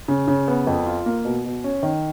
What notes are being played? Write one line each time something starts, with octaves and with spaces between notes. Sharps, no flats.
C#3
C#3
B3
F2
F4
A#3
B2
B2
C#4
D#3